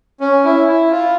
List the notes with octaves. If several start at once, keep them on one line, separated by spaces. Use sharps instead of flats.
C#4
E4
E4
F4